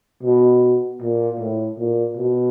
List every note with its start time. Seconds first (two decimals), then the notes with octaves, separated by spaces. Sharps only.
0.23 B2
1.02 A#2
1.40 A2
1.78 A#2
2.17 B2